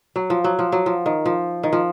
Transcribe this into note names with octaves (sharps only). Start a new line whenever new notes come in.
F#3
F3
F#3
F3
F#3
F3
D#3
F3
D#3
F3